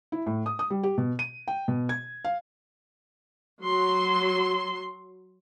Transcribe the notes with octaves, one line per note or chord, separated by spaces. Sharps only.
E4
A2
D#6
D#6
G3
G4
B2
D#7
G5
B2
G#6
F5
F#3 C6